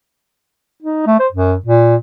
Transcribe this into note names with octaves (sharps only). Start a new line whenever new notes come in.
D#4
A3
C5
F#2
A#2